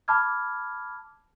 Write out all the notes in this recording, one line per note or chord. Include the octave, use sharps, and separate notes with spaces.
A5 B5 D6 F6 G#6